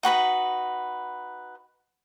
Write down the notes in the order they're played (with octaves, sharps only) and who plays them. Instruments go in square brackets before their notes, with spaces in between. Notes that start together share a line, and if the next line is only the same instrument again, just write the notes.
[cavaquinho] D#4 F#4 B4 B5